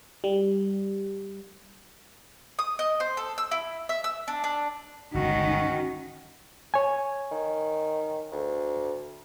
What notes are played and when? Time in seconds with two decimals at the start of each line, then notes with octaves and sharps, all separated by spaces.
0.24 G3
2.59 D#6
2.79 D#5
3.00 C5
3.17 A4
3.38 E6
3.51 E4
3.89 E5
4.04 E6
4.28 D4
4.44 D4
5.14 G1 C#2 D#3 C#4 F#4
6.74 C#5 G#5
7.31 D#3
8.32 D2